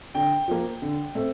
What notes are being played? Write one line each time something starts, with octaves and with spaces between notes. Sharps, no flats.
D3 G5
F3 A#3
D3
A3 C4